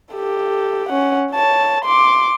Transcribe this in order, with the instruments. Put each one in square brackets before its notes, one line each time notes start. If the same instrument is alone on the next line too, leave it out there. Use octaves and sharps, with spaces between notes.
[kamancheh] G4 A4
C#4 F#5
C#5 A5
C6 D6